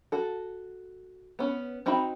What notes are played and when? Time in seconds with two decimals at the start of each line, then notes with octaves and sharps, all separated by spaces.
0.12 F#4 A4
1.39 B3 C#4
1.86 C4 D#4 F#4 G5 B5